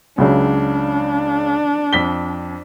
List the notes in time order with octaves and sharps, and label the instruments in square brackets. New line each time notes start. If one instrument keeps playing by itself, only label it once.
[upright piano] C#2 C#3 F#3 [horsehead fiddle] D4
[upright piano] F2 B6 G7